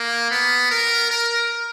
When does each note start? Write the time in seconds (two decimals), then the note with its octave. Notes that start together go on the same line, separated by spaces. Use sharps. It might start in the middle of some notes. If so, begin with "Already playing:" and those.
Already playing: A#3
0.31 B3
0.71 A#4
1.11 A#4